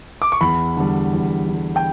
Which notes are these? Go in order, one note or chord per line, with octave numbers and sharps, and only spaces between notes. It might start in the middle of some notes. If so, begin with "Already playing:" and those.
D6
C#6
E2 B5
D3 G3
E2
D3 G3
G5